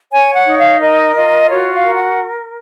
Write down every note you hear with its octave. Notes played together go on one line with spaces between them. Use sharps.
C#5 G#5
F#5
D#4
F5
A#4 D#5
F4 D#5
F#4 C#5
F5
A#4
F#5